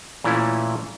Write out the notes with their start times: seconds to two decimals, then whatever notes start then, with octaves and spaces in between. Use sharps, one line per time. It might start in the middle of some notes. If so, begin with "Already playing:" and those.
0.24 A#2 E3 A3 C#4 E4